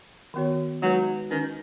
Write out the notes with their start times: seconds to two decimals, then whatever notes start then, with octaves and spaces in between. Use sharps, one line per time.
0.34 D#3 B3 F#4 C#5
0.82 F#3 G#3 D#4 F#4 B4
1.31 D#3 C#4 B4